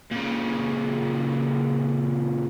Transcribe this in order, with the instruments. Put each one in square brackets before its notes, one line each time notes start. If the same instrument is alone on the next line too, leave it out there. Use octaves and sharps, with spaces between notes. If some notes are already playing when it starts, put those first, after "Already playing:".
[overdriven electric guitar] A#2 C#3